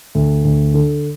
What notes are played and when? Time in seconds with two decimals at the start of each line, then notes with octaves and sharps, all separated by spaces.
0.15 D2
0.45 D2
0.74 D3